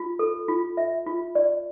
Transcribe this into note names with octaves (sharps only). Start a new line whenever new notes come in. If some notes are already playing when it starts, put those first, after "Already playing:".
Already playing: F4
A4
F4
E5
F4
D5